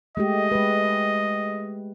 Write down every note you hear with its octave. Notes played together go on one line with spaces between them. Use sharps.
G#3 A3 G4 D#5
G#3 B4